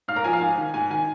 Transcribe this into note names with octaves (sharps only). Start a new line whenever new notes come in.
G#2 F5 F6
A#4 A#5
F3 G#5
F5
G#2 G#5
D#3
G#2 G#5
D#3 G#5